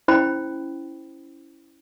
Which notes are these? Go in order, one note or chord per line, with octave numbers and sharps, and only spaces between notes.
C#4 E4 C5 G5 B5